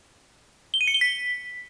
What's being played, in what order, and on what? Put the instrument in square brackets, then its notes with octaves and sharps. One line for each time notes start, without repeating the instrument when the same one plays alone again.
[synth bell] G7
D#7
C#7
G7
B6